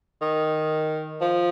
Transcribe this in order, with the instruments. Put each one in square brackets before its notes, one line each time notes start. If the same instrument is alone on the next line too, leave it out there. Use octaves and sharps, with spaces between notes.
[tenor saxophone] D#3
F3